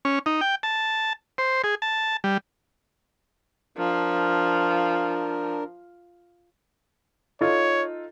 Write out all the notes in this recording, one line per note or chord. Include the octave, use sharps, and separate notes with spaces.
C#4
D#4
G5
A5
C5
G#4
A5
G3
F3 D4 A#4
D#4 F4 A4 C#5